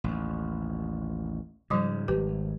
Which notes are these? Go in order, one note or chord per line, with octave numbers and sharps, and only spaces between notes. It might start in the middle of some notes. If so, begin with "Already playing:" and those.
A1 D#2
G#2 C#3 F3 G3 D6
G#1 G4 B4